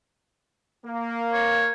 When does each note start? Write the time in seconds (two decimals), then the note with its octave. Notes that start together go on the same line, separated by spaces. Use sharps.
0.85 A#3
1.33 C#5